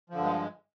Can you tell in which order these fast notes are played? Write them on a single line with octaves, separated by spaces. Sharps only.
F3 D3 G2 G#3